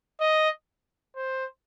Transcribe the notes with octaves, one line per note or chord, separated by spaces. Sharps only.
D#5
C5